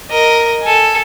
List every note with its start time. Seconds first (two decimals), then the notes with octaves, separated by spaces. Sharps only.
0.10 A#4 D#5
0.62 A4 G#5